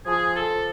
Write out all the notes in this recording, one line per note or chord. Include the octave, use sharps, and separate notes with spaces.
F3 G#4
A4
F3